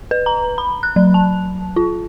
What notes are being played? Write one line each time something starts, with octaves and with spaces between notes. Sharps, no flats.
B4
A#5
B5
F#6
F#3
A5
F4